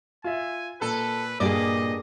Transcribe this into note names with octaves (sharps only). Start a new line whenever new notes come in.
F4 E5 G#5
A#2 A4 B4
G2 A#2 A#3 G4 G#4 D5 D#5